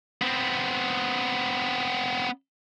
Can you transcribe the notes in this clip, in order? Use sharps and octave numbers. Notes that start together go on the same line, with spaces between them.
B3 C4